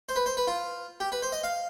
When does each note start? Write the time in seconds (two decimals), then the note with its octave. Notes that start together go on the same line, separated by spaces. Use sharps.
0.09 C5
0.16 B4
0.26 C5
0.37 B4
0.47 F4
1.00 G4
1.12 B4
1.22 C5
1.32 D#5
1.44 F5